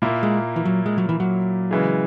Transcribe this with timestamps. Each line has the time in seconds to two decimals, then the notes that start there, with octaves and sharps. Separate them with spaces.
0.02 A#2 A#3 E4
0.23 G#3
0.56 E3
0.65 F#3
0.86 G#3
0.98 F#3
1.09 E3
1.20 F#3
1.71 C#3 E3 G#3